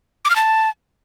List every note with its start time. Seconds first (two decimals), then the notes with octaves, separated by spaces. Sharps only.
0.25 D6
0.30 F6
0.36 A5